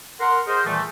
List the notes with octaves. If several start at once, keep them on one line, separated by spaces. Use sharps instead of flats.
A#4 F#5 C6
G#4 A#4 C5 D#5
A#2 D#3 E3 G3 A3